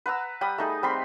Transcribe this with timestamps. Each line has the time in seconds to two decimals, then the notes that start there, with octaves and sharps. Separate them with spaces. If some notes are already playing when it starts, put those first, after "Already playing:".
0.06 B4 F#5 A#5 E6
0.41 G3 G5 B5 D#6
0.58 A3 D#4 G#4
0.83 G3 C4 B5 C6